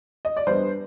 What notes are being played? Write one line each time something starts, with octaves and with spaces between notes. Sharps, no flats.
D#5
D5
G3 B3 D4 C5